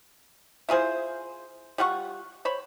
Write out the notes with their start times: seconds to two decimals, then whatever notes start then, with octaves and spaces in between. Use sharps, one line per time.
0.69 E4 F4 G#4 C5
1.78 G3 F4 F#5 C#6
2.45 C5 C#5 B5